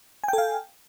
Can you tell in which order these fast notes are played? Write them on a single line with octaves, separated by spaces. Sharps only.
G#5 G5 A4 F5